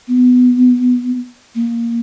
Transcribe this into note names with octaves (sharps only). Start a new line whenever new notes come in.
B3
A#3